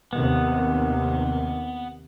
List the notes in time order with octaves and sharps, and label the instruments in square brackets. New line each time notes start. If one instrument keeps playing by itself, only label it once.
[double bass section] D#2 C3 D#3 [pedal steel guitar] B3